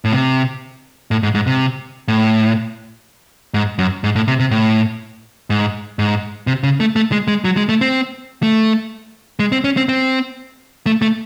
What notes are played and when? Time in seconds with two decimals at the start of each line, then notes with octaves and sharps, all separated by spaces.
0.05 A2
0.12 C3
1.11 A2
1.23 G#2
1.35 G#2
1.47 C3
2.08 A2
3.54 G#2
3.78 F#2
4.04 G#2
4.16 A2
4.28 C3
4.40 C3
4.51 A2
5.50 G#2
5.99 G#2
6.47 C3
6.63 C#3
6.80 A3
6.96 A3
7.12 G#3
7.28 G#3
7.44 F#3
7.57 G#3
7.69 A3
7.81 C4
8.43 A3
9.39 G#3
9.52 C4
9.64 C#4
9.77 C4
9.89 C4
10.86 A3
11.02 A3